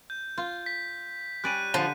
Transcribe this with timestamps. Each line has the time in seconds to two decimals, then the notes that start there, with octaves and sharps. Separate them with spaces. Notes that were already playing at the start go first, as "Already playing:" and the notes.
0.10 G6
0.38 F4
0.66 B6
1.44 G3 C#4 D5 F#6 D#7
1.74 D3 F3 D#7